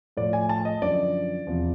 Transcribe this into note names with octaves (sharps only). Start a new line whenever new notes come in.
A2 F3 D5
G#5
A5
D#5
F#2 D3 F3 D5
E2 C3 F3